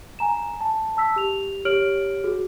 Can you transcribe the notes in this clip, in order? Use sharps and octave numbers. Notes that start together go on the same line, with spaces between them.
G#5 A#5 E7
A5
A5 E6 B6
G4 F7
G4 C#5 F6 D7 F#7
F#4 G#4